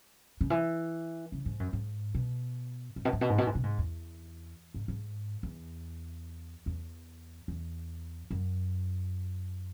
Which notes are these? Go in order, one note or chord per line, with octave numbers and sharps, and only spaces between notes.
C#3
E3
C#3
G#2
F#2
G#2
B2
G#2
B2
G#2
B2
G#2
B2
G#2
B2
G#2
E2
G#2
G#2
E2
E2
E2
F#2